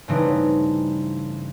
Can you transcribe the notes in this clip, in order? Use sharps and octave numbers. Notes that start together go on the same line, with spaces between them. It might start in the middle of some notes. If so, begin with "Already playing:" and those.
G2 C#3 E3 A3 C4 D#4